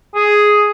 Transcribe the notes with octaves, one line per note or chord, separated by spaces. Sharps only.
G#4